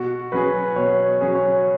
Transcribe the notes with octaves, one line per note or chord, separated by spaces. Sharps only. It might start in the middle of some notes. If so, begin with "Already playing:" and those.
Already playing: B2 F#4
F#3 C#4 G#4 B4
B2 C#5
F#3 C#4 G#4
C#5